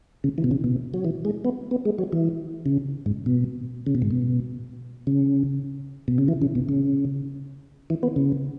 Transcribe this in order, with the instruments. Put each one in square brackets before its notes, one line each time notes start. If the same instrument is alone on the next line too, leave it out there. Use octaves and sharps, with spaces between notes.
[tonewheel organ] C#3
E3
B2
C#3
B2
F#3
E3
G#3
B3
B3
G#3
F#3
E3
C#3
G#2
B2
C#3
B2
G#2
B2
C#3
B2
C#3
E3
C#3
B2
C#3
E3
B3
C#3